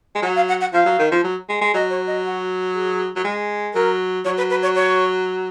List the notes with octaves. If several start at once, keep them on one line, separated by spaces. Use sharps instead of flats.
G#3
F#3 F#5
F5
F#5
F#5
F3 F5
F#3
D#3
F3
F#3
G#3
G#3
F#3 D#5
C#5
D#5
F#4
G#4
F#3
G#3
F#3 A#4
F#3 C#5
B4
B4
C#5
C#5